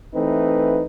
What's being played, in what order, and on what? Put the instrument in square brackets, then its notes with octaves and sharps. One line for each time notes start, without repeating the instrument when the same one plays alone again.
[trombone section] E3 A3 C4 D#4 B4